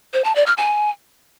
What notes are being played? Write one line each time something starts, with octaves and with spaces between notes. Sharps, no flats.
C5
A5
D5
F6
G#5